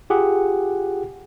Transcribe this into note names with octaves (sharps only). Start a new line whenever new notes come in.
F4 G4 G#4 F#5